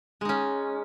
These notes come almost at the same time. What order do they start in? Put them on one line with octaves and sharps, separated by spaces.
G#3 D#4 C#4